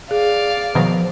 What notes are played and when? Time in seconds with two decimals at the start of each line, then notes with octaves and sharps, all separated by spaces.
0.11 G#4 D5 F5
0.75 B2 D#3 F3 F#3